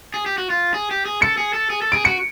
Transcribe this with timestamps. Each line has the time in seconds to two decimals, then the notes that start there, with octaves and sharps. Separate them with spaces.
0.14 G#4
0.26 G4
0.38 F#4
0.50 F4
0.74 G#4
0.91 G4
1.05 G#4
1.22 A4 C#7
1.37 G#4
1.53 A4
1.70 G#4
1.82 A4
1.92 G#4 D7
2.05 F#4 C#7